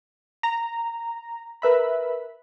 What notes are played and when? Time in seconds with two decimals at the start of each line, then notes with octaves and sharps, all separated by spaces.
0.43 A#5
1.62 A#4 B4 E5 B5